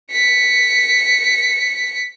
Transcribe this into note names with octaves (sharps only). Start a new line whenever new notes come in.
B6 C#7